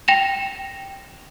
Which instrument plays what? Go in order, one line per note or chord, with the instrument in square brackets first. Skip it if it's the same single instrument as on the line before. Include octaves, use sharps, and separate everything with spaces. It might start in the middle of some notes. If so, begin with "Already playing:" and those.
[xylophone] G5 A#6 E7 F7